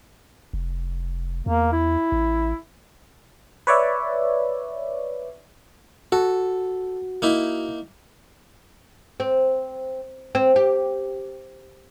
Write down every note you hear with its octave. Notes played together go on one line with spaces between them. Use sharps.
F1
E2 A#3
E4
A1
B4 C#5 D5 E5
F#4 A4
A#3 D#4 E4
C4
C4
G4